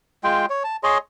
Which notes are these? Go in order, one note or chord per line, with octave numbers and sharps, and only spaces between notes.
G#3 F4 G5
C#5
A5
G#4 C#5 D#5 C6